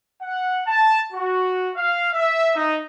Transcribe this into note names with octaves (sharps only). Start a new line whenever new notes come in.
F#5
A5
F#4
F5
E5
D#4